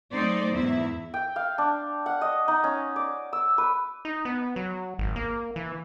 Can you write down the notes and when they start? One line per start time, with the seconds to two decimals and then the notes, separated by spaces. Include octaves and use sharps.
0.11 F#3 A3 C4 D#4 C5 D5
0.51 E2 G#2 E4 E5
1.14 G5
1.36 F5
1.58 D4
2.06 F#5
2.21 D#5
2.48 D#4
2.64 C#4
2.96 D5
3.33 E6
3.58 B4
4.05 D#4
4.25 B3
4.56 F#3
4.99 G#1
5.16 A#3
5.56 E3